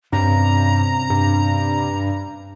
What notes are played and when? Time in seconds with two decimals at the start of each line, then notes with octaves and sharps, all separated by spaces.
0.13 G2 C3 C4 C#4 A#5
1.10 G2